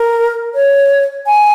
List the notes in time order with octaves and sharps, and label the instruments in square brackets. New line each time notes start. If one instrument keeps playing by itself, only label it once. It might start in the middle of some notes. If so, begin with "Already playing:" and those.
Already playing: [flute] A#4
C#5
G#5